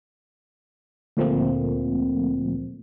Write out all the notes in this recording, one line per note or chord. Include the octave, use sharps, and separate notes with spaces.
D2 A#2 F3 A3 A#3 C4